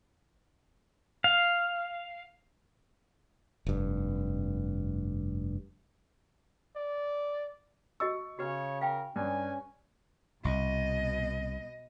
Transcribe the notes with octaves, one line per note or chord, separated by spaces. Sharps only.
F5
F1 G2
D5
F#4 D#5 C#6 E6
C#3 F#4 B4 C#5
A#4 F5 G5
G2 C#4 G#5
C2 B2 D#5